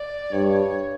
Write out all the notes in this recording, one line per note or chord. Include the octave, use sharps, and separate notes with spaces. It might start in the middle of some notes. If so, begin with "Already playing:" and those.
Already playing: D5
G2 C#5